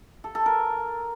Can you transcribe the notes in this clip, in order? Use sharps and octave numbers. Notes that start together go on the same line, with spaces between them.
A4
A4
A#4